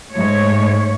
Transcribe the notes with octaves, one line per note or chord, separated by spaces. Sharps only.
G#2 A3 C#5